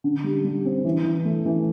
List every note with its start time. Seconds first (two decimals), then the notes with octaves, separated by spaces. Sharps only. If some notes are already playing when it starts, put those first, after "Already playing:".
0.04 D3
0.24 G3
0.45 G3
0.65 C4
0.85 E3
1.04 E3
1.25 A3
1.45 E3